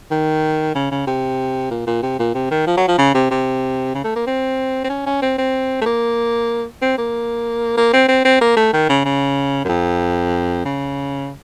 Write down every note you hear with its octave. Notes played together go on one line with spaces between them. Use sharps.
D#3
C#3
C#3
C3
A#2
A#2
C3
A#2
C3
D#3
F3
F#3
F3
C#3
C3
C3
C#3
A3
A#3
C4
C4
C#4
C#4
C4
C4
A3
A#3
C4
A#3
A#3
C4
C4
C4
A#3
A3
D#3
C#3
C#3
F#2
F2
C#3